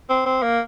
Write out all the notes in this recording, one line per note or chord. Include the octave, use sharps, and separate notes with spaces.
C4
C4
A#3